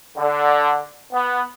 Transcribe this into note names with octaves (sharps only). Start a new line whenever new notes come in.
D3
B3